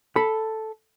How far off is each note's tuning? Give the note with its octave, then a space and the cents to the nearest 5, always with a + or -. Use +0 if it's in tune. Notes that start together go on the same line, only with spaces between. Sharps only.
A4 +0 B5 +0